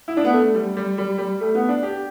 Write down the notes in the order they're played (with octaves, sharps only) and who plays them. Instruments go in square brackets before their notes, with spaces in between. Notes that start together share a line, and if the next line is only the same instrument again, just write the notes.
[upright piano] E4
D4
B3
A3
G3
G3
G3
G3
A3
B3
D4
G4